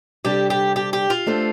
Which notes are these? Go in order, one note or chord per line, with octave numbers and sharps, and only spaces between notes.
C3 G3 D4 G4 A4 D5
G4
G4
G4
F4
A3 D4 A4 C5